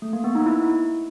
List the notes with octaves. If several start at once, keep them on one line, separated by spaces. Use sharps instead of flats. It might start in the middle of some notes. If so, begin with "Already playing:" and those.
A3
A#3
B3
D#4
E4